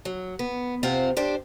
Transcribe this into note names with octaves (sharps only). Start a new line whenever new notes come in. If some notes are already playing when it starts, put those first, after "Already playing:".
F#3
B3
C3 C4 F4 C5 F#5
D4 G4 C5